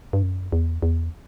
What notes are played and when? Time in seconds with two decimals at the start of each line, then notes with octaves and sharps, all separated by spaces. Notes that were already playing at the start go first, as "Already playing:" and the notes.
0.13 G2
0.23 F#2
0.52 E2
0.82 E2